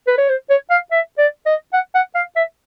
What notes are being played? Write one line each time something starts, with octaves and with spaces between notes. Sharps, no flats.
B4
C#5
C5
C#5
F5
E5
D5
D#5
F#5
F#5
F5
E5